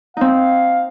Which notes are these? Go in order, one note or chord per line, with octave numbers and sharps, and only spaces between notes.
C4 D#4 F5